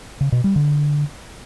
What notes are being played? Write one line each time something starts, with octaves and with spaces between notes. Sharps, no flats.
C#3
B2
G3
D3